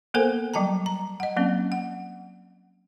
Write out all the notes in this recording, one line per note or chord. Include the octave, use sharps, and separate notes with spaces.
A#3 B3 A4 A#4 C5 G#5
F#3 G3 G5 A5 A#5
A#5
D#5 F#5
F#3 A#3 C4 C#4
F#5